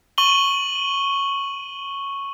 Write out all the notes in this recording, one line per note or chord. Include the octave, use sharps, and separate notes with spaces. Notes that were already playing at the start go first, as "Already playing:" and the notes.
C#6 D#7 F#7 G7